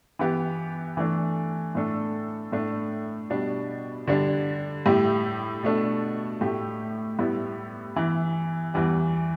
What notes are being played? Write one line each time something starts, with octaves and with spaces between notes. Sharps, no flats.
E3 B3 G4
E3 A3 D4 A4
A2 A3 D4 A4
A2 A3 D4
B2 G3 D4
D3 G3 D4
A2 G3 E4 G4
B2 A3 D4 A4
A2 A3 G4
A2 G3 B3 E4 G4
E3 B3 E4
E2 E3 G3